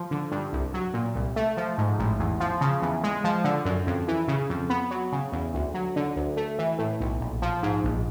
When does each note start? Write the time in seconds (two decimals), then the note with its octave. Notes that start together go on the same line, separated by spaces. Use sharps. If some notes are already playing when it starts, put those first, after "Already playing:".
Already playing: F3
0.11 D3
0.31 G2
0.53 C2
0.74 F#3
0.94 A#2
1.15 C2
1.36 A3
1.57 F3
1.78 G#2
1.99 A1
2.19 E2
2.40 F3
2.61 C#3
2.82 E2
3.04 G#3
3.24 F3
3.44 D3
3.65 F#2
3.87 F2
4.08 E3
4.28 C#3
4.50 F2
4.70 B3
4.91 F#3
5.12 C#3
5.32 E2
5.54 D2
5.74 F#3
5.96 D3
6.16 D2
6.37 A3
6.59 E3
6.79 A2
7.00 B1
7.21 A#1
7.42 F3
7.63 G#2
7.84 A#1